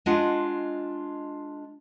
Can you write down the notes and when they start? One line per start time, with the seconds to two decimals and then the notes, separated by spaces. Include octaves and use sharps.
0.06 G#3 D4 F4 D#5 F#5